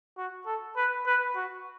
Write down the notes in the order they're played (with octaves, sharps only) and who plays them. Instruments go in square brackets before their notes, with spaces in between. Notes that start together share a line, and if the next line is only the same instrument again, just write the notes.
[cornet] F#4
A4
B4
B4
F#4